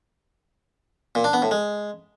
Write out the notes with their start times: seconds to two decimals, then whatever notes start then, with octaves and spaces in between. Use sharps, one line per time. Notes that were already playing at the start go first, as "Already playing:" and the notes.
1.15 A#2
1.24 D4
1.33 B3
1.42 A2
1.51 G#3